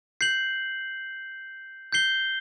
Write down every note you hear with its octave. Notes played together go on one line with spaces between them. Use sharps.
G6 C7 F#7
G6 C7 G7